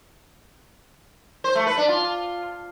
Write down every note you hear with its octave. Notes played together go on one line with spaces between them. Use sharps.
C5
A3
B4
D4
F4